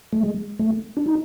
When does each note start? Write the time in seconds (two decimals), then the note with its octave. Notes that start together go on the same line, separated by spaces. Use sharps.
0.13 A3
0.23 G#3
0.59 A3
0.97 D4
1.06 D#4